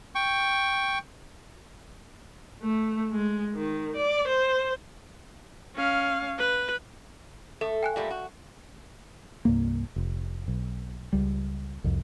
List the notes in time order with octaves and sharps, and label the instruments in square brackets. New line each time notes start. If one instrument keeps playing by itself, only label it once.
[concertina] G5 C#6
[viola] A3
G#3
D#3
D5
C5
C#4 F5
B4
[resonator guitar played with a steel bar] A3 [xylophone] A4
[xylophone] G5 G#5 F#6
[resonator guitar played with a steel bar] A#2 G3 A3
F#4
[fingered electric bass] C2 G2 A#3
F1
B1
C#2 G3
C2 F2